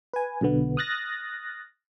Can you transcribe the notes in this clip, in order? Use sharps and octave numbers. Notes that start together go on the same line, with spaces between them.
B4 G#5
B1 B2 D3 B3
D#6 F6 F#6 A6 A#6